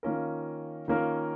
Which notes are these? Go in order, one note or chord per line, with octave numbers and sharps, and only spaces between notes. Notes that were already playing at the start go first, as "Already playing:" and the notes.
D#3 A#3 C#4 F4 A#4
D#3 A#3 C#4 F4 A#4